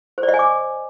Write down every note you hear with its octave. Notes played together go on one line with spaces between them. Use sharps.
C5
D5
D#5
G#5
D6